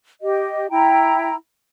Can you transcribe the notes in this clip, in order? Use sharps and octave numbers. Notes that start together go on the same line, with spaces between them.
G4 D#5
E4 G5 A#5